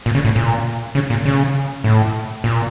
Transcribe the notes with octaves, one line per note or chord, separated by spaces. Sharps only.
A#2
C#3
A2
A#2
C#3
A#2
C#3
A2
A#2